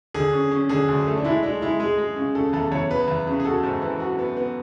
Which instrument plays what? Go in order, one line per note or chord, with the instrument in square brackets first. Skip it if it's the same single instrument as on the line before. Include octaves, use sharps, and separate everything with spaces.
[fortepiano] D3 [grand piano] G#4
[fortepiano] C#4
C#4
[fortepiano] D3 [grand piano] G#4
[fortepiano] D2
A3
[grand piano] D4
[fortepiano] G#3 [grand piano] E4
[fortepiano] G#3 [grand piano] D4
[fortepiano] G#3 [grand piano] E4
[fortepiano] G#3 [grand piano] G#4
[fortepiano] G#3
C#3
[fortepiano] C#3 [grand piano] A4
[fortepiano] E2 [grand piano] A4
[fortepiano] E2 [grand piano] C#5
[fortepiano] B3 [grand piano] B4
[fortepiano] E2
C#3
[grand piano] G#4
[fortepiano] F#4 [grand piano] A4
[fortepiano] G#2
E3
F#4
B3
B3